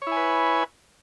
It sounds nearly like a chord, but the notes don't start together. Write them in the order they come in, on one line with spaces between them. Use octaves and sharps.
C#5 E4 G#5 B4